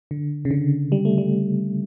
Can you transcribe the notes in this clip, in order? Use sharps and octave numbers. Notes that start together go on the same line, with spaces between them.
D3
C#3
D3
G3
A3
G3